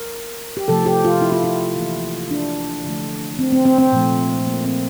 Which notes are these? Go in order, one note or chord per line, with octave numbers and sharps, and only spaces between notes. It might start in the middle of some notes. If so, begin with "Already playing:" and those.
Already playing: A#4
G4
C3 F3 A3 A4
G4
F4
E4
F4
E4
E3 A#3
D4
D3 F3 A3
C4
C4
C4
C4
A#2 F3 A3
A#3
C4